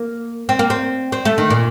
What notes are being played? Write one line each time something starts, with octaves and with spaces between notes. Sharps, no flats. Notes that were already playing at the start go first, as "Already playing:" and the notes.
Already playing: A#3
C4
A#3
C4
C4
A3
D#3
A#2